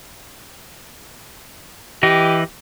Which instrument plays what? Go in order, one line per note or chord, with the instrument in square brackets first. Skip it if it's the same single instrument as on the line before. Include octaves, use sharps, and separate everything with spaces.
[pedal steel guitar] E3 D#5 [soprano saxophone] G4